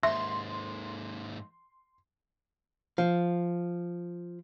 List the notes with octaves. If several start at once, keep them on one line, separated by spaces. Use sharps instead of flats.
D#2 G#2 E5 C6
F3